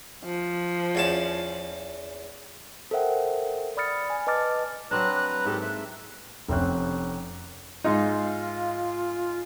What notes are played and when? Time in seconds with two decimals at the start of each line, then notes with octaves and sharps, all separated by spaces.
0.25 F3
0.95 E2 C#4 A5
2.91 A4 A#4 C5 E5 F#5 G5
3.77 D5 B5 D#6 F6 A6 C#7
4.10 G#5
4.27 B4 D#5 A5 D6 F6 A6
4.91 F#3 C4 D4 B4 A#5 F#6
5.16 F#6
5.46 G#2 A#3 G4 A4
5.62 E5
6.48 F1 C3 C4 C#4 F#6
7.84 G#2 D#4 F4